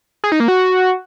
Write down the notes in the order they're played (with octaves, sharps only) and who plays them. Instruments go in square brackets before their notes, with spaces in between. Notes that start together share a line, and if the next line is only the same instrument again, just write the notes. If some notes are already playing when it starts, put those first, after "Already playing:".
[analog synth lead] G#4
D#4
A#3
F#4